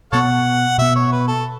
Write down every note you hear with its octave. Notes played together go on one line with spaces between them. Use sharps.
B2 B3 A4 C#5 F#5
B2 B3 E5
C#5
B4
A4